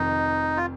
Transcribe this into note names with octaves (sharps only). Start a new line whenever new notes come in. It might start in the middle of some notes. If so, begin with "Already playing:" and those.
Already playing: F1 F2 D#3 D#4
F4